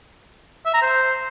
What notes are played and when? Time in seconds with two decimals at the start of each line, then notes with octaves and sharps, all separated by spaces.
0.66 E5
0.74 A#5
0.82 C5